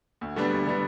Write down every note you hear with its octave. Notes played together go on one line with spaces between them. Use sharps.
D2
D3 G3 B3 D4
D2
D3 G3 B3 D4